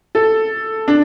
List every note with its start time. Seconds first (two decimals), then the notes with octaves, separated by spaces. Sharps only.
0.15 A4
0.88 D4